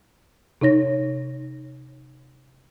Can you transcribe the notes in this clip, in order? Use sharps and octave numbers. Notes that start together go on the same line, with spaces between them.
C3 D#4 C#5 A#6